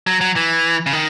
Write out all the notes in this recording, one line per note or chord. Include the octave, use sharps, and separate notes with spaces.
F#3
F#3
E3
C#3
D#3